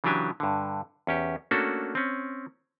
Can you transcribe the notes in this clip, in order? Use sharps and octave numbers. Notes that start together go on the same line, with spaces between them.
C#3 E3 F#3 D4 G4 G#5
G2 D3
E2 C#4 G4
A3 A#3 C#4 D4 F#4 A4
C4 C#4